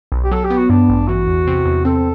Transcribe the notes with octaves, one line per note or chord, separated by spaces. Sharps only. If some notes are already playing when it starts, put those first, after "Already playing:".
B1
G4
F#3 A4
G4
B3
F#4
G2 D4
A1
E3 F#4
E2
C3
E2
C4 A4